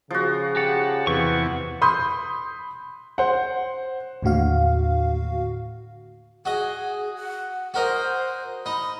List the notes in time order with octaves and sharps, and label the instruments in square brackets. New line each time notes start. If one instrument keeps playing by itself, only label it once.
[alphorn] C#3 [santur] F3 F#4
[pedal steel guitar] G4 F#5 [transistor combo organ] A5
[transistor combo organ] E2 C3 E3 [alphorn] B4 [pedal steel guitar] F#5 C#6
[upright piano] B5 C6 D#6 G6
C5 F#5
[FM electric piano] D#2 A2 D3 F#4 F5
[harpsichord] F#4 D#5 [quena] G#4
[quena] F#5
F#5
[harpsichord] F#4 A#4 D#5 [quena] C5
[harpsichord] D#4 [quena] B5